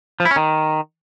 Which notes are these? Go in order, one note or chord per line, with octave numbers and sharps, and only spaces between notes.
F3
E4
C#4
D#3